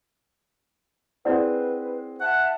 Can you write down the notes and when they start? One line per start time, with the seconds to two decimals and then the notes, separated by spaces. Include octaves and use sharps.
1.25 C4 E4 G#4 B4 C5 D5 F#5
2.21 E5 F#5 A5